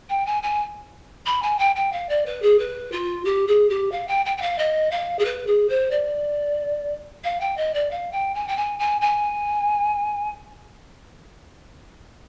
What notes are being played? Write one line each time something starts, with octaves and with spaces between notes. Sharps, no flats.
G5
G#5
G#5
B5
G#5
G5
G5
F5
D5
B4
G#4
B4
F4
G4
G#4
G4
F5
G5
G5
G5
F5
D#5
F5
G#4
B4
G#4
C5
D5
F5
G5
D#5
D5
F5
G5
G#5
G5
G#5
G#5
G#5